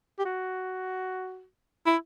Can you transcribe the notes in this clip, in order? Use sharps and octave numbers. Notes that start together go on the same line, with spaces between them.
G4
F#4
E4